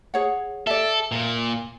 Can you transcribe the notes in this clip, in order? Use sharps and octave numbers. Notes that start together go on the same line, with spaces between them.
G#4 C#5 F#5
A4 D5 E5
A#2